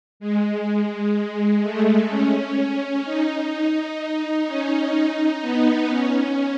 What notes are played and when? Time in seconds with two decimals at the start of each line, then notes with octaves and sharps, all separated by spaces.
0.20 G#3
0.67 G#3
1.15 G#3
1.62 A3
2.09 C#4
3.04 D#4
4.47 C#4
4.95 D#4
5.41 B3
5.89 C#4